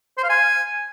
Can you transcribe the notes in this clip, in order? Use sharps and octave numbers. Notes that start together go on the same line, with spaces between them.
C5
F5
G#5